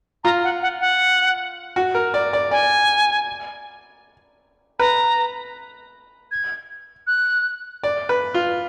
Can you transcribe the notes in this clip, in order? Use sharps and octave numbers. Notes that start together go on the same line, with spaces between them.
F4 A#5
F#5
F#5
F#5
F#4
A#4
D5
D5
D5 G#5
B4 A#5
G#6
F#6
D5
B4
F4